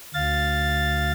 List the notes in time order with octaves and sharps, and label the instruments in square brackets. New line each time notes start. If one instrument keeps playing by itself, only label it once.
[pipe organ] D2 F5 A6